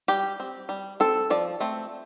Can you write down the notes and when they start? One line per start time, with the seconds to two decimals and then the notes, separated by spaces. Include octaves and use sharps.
0.08 G3 G4
0.40 C4
0.69 G3
1.00 C4 A4
1.30 F3 D5
1.60 A3 C4